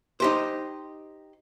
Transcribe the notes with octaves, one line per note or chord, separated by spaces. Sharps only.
D#4 G4 C5